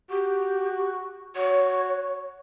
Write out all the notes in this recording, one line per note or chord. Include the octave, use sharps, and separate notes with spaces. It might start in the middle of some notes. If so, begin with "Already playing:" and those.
F#4 G4
F#4 C#5